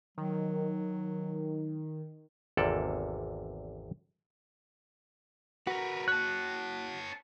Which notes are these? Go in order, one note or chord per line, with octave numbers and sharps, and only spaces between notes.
D#3 F#3
G#1 E2 C3 A#3 A4 D5
F#4 A#4 B4
C#5 A5 F#6